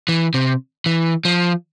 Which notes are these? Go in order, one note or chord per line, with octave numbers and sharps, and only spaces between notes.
E3
C3
E3
F3